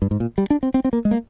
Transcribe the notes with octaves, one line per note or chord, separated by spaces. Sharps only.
G2
G#2
A#2
G3
D4
C4
C4
C4
A#3
G#3
A#3